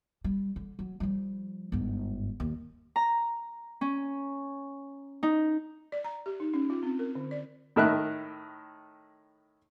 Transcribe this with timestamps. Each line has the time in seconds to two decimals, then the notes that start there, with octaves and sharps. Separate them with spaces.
0.24 G3
0.56 D3
0.79 F#3
1.00 F3 G3
1.72 G1 G#2
2.40 D#2
2.96 A#5
3.81 C#4
5.23 D#4
5.92 D5
6.04 A#5
6.26 G4
6.40 D#4
6.54 C#4
6.70 F4
6.83 C4
6.99 A#4
7.15 D3
7.31 D5
7.76 A2 D#3 E5 F#6